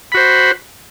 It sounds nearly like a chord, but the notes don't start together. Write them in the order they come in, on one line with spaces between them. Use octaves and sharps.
B5 F#4 C5